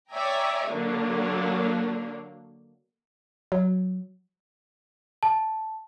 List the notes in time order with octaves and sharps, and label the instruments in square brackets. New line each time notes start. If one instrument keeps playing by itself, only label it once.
[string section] C#5 D5 E5 G5 G#5 A#5
D3 F#3 A#3 D4
[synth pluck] F#3
[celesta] A5